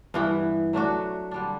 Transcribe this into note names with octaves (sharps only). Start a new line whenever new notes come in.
G2 E3 B3 E4
F#3 A3 D4 F#4
D3 G3 D4